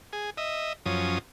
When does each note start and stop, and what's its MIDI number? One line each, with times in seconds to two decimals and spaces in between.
0.13 0.30 68
0.37 0.73 75
0.37 0.73 76
0.86 1.18 42
0.86 1.18 53
0.86 1.18 61
0.86 1.18 87